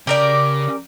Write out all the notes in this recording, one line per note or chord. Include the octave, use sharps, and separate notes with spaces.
C#3 G4 A#4 D5